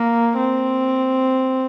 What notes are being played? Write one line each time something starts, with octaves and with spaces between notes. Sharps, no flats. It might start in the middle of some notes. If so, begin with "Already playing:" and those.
Already playing: A#3
C4